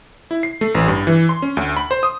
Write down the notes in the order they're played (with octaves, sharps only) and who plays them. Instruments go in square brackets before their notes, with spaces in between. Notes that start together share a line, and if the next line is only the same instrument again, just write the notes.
[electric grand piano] E4
C7
A3
A1
G2
E3
C6
C#4
D2
B5
C5
D#6